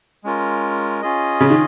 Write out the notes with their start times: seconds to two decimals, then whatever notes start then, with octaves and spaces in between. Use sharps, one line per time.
0.24 G#3 C#4 F4 A#4
1.02 C#4 F4 G#4 D#5
1.40 C#3
1.50 D#3